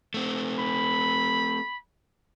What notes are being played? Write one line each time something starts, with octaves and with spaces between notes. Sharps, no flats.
A3 C4
B5